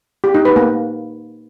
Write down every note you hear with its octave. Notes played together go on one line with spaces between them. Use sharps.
G4
D#4
B4
A#3